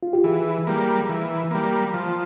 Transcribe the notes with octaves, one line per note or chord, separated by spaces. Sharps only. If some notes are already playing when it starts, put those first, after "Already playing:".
F4
G4
E3 G#4
G3 A#3
E3
G3 A#3
F3